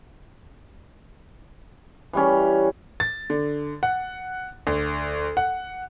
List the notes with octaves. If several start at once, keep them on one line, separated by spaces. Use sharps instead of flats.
E3 G3 C#4
A6
D3
F#5
D2
F#5